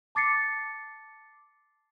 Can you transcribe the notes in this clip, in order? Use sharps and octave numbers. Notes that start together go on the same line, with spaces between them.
A5 D6 A6 C7 C#7